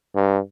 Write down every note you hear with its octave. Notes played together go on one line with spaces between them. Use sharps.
G2